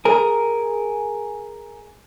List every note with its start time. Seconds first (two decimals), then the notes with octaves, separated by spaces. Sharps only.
0.05 G#4 A#4